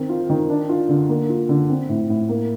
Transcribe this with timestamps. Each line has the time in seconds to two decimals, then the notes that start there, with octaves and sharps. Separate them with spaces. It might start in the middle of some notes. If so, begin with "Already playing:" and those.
Already playing: D#3 C4
0.09 F4
0.30 D#3
0.50 D4
0.69 F4
0.89 D3
1.09 A#3
1.29 F4
1.49 D3
1.69 C4
1.89 A2
2.09 A2
2.29 A#3